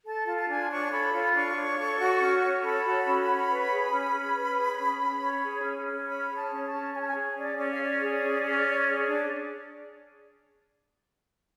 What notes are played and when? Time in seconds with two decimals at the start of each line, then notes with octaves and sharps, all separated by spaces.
0.06 A4 A5
0.27 F4 A5
0.38 A5
0.49 D4 G#5
0.70 C#5 C#6
0.91 A4 B5
1.14 F4
1.35 D4 C#6
1.56 C#5
1.78 A4
1.99 F#4
2.21 C#4
2.42 C#5
2.63 A4 B5
2.85 F#4
3.07 C#4
3.28 C#5
3.49 B4
3.71 G#4
3.92 C#4
4.14 C#4
4.35 B4
4.57 G#4
4.78 C#4
5.00 C#4
5.21 C#5
5.43 G#4
5.64 C#4
5.86 C#4
6.07 C#5 B5
6.29 G#4
6.36 A5
6.50 C#4
6.65 A5
6.72 C#4
6.93 C#5 G#5
7.00 A5
7.07 G#5
7.15 G#4
7.36 C#4 D5
7.58 C#4 D5
7.71 F5
7.79 C#5 D5
8.01 G#4
8.22 C#4
8.43 C#4
8.65 C#5
8.87 G#4
9.08 D4